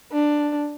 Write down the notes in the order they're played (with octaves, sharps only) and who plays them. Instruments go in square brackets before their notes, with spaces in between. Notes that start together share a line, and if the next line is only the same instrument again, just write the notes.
[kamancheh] D4